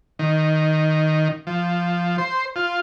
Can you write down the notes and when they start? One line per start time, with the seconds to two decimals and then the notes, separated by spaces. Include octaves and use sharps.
0.19 D#3
1.47 F3
2.18 C5
2.56 F4